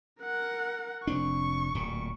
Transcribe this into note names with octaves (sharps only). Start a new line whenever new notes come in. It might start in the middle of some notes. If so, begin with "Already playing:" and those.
A#4 F#5
F1 C4 D4 C#6
D1 A#2